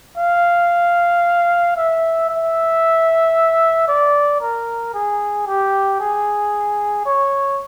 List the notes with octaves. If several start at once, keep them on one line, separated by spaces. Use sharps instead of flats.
F5
E5
E5
D5
A#4
G#4
G4
G#4
C#5